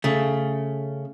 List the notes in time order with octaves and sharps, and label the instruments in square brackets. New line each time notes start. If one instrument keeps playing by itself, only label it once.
[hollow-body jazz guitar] C#3 A3